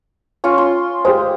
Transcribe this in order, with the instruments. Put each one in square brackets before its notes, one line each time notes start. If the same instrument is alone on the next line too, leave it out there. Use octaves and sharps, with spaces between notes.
[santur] C#4 F4 C#6
C6
[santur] G#3 [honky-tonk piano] G4 C5